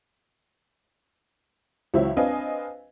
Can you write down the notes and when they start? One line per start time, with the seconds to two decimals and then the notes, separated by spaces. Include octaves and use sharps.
1.94 C#2 E3 F#3 C5 C#5 E5
2.17 C4 D4 B4 D#5 F5 G#5